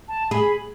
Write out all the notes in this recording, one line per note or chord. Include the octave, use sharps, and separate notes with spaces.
A5
G#4 B5